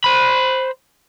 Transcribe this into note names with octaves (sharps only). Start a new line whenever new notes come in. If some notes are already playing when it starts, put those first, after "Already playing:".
C5 B5